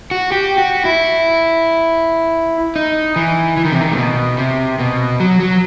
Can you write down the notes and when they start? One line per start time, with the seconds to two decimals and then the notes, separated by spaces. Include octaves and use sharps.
0.11 F#4
0.32 G4
0.58 F#4
0.85 E4
2.76 D#4
3.16 E3
3.57 E3
3.65 D#3
3.72 C3
3.81 D#3
3.92 A2
3.97 B2
4.38 C3
4.79 B2
5.20 F#3
5.40 F#3